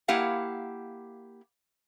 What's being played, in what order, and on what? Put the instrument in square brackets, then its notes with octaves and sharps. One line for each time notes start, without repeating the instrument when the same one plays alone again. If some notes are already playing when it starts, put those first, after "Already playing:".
[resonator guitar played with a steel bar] A#3 E4 G4 F5 F#5 A5